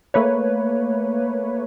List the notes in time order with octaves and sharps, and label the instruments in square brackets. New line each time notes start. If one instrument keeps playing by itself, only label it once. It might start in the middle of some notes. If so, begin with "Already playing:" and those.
[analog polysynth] A3 A#3 B4 C#5